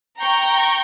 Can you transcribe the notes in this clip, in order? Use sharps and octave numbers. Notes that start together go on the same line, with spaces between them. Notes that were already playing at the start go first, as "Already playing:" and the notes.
G5 A#5 C#6 G6